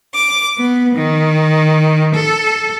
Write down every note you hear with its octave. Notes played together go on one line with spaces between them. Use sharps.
D6
B3
D#3
A4